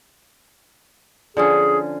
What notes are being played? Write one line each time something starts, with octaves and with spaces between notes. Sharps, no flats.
D3 F3 C#4 G#4